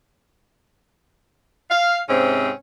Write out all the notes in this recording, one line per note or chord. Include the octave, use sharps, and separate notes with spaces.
F5
G#2 C3 C4 C#4